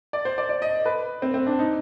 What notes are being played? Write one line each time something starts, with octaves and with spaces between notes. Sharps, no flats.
D5
C5
D5
D5
D#5
B4
C4
C4
D4
D#4